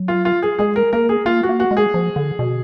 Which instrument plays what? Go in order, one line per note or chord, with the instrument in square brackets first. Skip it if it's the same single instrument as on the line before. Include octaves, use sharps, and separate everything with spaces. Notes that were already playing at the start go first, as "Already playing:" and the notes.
Already playing: [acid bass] F#3
[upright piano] F4
F4
G#4
[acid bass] G#3 [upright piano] G#4
[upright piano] A#4
[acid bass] A#3 [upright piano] A#4
[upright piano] G#4
[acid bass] A#3 [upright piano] F4
[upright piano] F#4
[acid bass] A#3
[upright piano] F#4
[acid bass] G#3
[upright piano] G#4
[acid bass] F3
D3
B2